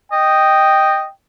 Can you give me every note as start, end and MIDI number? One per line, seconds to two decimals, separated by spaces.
0.12 1.04 75
0.12 1.11 79